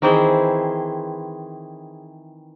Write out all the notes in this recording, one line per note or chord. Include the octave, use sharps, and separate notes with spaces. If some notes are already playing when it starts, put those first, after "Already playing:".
D#3 E3 C4 E4 G#4 C5